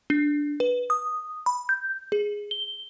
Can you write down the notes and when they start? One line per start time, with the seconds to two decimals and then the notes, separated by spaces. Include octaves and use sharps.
0.10 D4
0.60 B4
0.90 D#6
1.46 B5
1.69 G6
2.12 G#4
2.51 G7